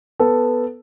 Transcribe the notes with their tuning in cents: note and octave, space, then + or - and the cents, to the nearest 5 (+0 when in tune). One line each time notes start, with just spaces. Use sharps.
B3 +0 A4 +0